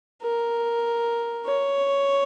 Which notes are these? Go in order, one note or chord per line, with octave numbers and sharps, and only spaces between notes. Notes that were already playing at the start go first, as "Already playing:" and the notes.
A#4
C#5